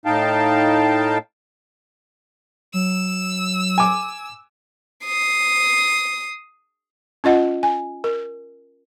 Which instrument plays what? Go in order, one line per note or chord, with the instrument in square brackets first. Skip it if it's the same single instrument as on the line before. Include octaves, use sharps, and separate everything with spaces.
[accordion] A2 D#4 F5 G5 A5
[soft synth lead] F#3 [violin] E6
[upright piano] G#5 D6
[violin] D#6 C7
[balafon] C#4 F4 D#5 F#5
G#5
A#4